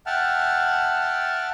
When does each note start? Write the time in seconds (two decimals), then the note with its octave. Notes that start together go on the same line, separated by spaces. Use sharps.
0.06 E5 F#5 G5 A5 F6